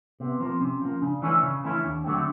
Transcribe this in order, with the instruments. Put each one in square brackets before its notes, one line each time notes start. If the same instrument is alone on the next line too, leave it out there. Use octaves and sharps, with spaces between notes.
[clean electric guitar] C3 [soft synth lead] B3
[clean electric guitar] F3 A#3 [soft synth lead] C4
[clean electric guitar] C3 [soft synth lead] C#4
[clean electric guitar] F3 A#3
[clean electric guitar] C#3 [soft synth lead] D4
[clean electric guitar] E3 A3 C#4 E4
C#3
E3 A3 C#4 E4
D#2
D3 F#3 A3 C4